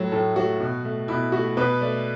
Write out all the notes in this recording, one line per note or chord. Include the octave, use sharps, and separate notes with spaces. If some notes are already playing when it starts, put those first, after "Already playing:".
Already playing: A2 F#3 A3
A2 A4
F#3 A3 F#4
B2
A3
B2 E4
A3 F#4
B2 B4
A3 D5